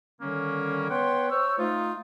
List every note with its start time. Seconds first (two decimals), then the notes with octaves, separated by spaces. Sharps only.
0.21 D3 D#3 G3 A#3 C#4
0.91 B3 B4 C#5 F#5 G5 C6
1.31 C5 C#5 E6
1.59 A3 D#4 F4